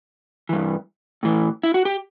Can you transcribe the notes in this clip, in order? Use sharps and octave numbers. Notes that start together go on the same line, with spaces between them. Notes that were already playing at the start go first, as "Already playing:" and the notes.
G2 E3
A2 E3
E4
F#4
G4